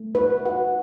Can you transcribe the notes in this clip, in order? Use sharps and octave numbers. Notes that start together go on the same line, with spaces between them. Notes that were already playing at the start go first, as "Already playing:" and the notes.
Already playing: A3
D#4 B4
F#4 F#5